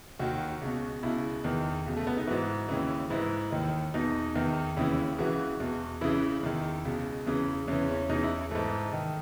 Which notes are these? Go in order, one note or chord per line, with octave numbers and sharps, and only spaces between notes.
D#2 D#3 F#4
C#2 B2
C#2 B2 E4
E2 D#3
C#2 B2
A3
B3
D#4
G#2 E3 F#4
D#2 C#3 E3
G#2 E3 E4
D#2 D#3
E2 B2 D#4
E2 D#3
D#2 C#3 E3 E4
C#2 C#3 E3 F#4
E2 B2
C#2 C#3 E3 E4
E2 D#3
C#2 B2
E2 C#3 E3
E2 C#3 E3 C#4
C#4
E2 C#3 E3 D#4
E4
G#2 E3 A3
D#3